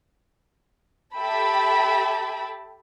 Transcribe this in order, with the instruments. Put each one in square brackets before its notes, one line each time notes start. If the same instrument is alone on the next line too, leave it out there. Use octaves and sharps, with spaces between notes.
[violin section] G4 A4 E5 G5 A5 B5